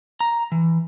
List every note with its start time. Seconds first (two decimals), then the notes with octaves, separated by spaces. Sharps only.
0.21 A#5
0.52 E3